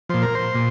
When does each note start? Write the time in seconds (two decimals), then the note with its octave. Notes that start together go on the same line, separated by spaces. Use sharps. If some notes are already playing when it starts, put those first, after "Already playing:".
0.09 A#2 F3 C5
0.22 A#4
0.35 C5
0.55 A#2